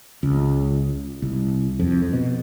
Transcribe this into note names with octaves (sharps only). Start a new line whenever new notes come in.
C#2
C2
F2
B2